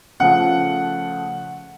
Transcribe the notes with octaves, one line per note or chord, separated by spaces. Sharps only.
C#3 F3 A3 F#5